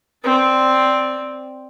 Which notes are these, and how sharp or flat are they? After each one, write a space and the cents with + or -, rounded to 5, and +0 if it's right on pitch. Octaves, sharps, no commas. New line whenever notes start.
C4 +0 D5 +0